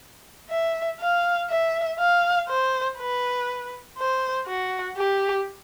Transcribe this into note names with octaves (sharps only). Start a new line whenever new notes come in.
E5
F5
E5
F5
C5
B4
C5
F#4
G4